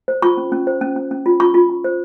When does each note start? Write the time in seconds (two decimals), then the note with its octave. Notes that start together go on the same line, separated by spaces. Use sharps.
0.08 C5
0.22 F4 C#6
0.37 C#4
0.52 C#4
0.67 C5
0.81 C#4
0.96 C#4
1.11 C#4
1.26 F4
1.40 F4 C#6
1.54 F4
1.70 F4
1.84 C5